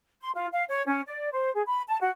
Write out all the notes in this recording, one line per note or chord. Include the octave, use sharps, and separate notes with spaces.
C6
F4
F5
C#5
C#4
D5
C5
G#4
B5
A5
F#4